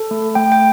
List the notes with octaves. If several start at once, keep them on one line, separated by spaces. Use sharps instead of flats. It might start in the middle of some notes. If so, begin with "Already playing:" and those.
Already playing: A4
A3
A3 G5
G5